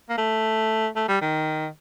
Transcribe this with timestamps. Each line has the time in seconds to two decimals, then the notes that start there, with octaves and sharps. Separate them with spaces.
0.09 A#3
0.18 A3
0.96 A3
1.08 G3
1.21 D#3